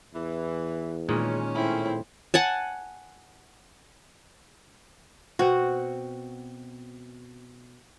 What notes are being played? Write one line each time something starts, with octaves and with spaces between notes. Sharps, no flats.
E2 E3
A#2 D#3 G#3 C#4
A2 C4 E4
F#5 G#5 A5
B2 C4 F#4